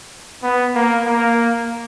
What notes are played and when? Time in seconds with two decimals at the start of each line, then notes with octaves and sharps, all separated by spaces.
0.43 B3
0.75 A#3
1.07 A#3